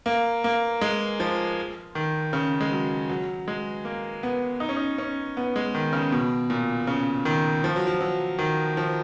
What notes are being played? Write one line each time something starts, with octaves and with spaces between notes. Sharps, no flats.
A#3
A#3
G#3
F3
D#3
C#3
G#3
F#3
F#3
G#3
A#3
B3
D#4
C#4
D#4
C#4
B3
G#3
D#3
C#3
B2
A#2
C#3
D#3
F3
F#3
F3
F#3
D#3
F3